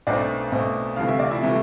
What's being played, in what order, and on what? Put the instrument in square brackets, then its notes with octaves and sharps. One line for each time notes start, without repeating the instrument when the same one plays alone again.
[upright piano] B1 B2 A3 C4 D4 D5
B1 B2 A3 C4
D2 C3 E3 A3 F5
E5
D5
E4 E5
C3 E3 A3